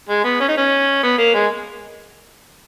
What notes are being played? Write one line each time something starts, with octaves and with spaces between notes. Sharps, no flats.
G#3
B3
C#4
D#4
C#4
B3
A#3
G#3